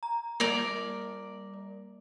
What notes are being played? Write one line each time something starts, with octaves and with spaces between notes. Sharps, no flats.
A#5
G3 A#3 A#4 D5